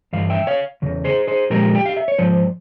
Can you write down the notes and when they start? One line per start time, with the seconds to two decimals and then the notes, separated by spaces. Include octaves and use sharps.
0.13 G2 E3 F5
0.30 E5 G5
0.47 C#5 F5
0.82 E2 C#3
1.04 G#4 C5
1.27 G#4 C5
1.50 A#2 F3 G#3 G4 A#4
1.75 G5
1.86 F5
1.96 E5
2.08 C#5
2.18 G#2 F3 C5